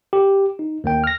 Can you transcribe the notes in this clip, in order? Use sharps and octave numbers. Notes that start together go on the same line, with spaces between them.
G4
D#4
D#2 A#3 G5
F6 A#6